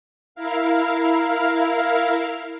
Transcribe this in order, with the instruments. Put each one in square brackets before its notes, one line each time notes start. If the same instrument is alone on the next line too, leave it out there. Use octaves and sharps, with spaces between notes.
[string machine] E4 A#4 F5